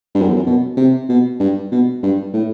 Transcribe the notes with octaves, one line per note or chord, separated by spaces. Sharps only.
G2
F#2
E2
F#2
B2
C3
B2
G2
B2
G2
A2